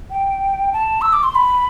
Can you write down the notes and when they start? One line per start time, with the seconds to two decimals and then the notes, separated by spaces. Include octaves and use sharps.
0.10 G5
0.73 A5
1.01 E6
1.13 D6
1.23 C6
1.35 B5